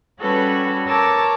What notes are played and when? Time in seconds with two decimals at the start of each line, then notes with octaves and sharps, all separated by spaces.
0.19 G3 C#4 F#4 A4 B4 C#5
0.86 A#4 C#5 A5 D6 E6